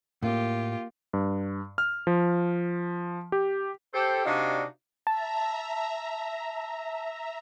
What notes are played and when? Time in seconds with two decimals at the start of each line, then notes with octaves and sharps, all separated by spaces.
0.23 A2 A#3 F4 G4
1.13 G2
1.78 F6
2.07 F3
3.32 G4
3.94 G4 A4 C5
4.25 C3 D4 D#4 F#4 D5 F5
5.07 E5 A5 A#5